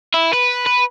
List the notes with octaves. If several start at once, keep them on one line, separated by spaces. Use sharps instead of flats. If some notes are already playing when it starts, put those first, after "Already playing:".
E4
B4
B4